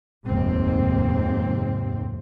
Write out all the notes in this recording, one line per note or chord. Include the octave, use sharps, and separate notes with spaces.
F1 D#2 G#2 C4